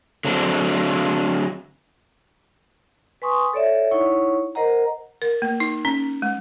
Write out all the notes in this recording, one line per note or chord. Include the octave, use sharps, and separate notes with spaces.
D3 F#3 C4 D4
B4 G#5 C6 C#6 D#6
A4 C#5 D5 E5
D#4 E4 C#5 F#5 C#6
A#4 C5 D#5 F#5 A#5
A#4
A#3
D#4
C#4
G#3